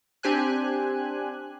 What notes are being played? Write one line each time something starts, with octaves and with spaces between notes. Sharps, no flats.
C4 D4 G4 C5 G#5 F#6